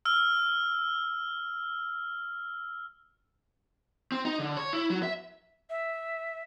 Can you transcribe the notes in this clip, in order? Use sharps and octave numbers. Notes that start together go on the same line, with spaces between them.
E6 F6
C4
D#4
D3
C#5
E4
F#3
E5
E5